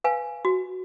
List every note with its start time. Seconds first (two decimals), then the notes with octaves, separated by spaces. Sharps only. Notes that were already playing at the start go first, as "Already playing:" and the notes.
0.04 B4 F5 G#5
0.45 F#4